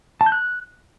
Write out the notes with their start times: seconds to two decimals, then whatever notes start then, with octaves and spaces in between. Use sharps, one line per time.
0.21 A5
0.26 G6
0.32 F#6